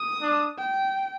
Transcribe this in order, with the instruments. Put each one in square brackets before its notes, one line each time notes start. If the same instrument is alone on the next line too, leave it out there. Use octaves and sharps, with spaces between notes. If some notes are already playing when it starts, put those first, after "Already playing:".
Already playing: [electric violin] D#6
[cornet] D4
[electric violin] G5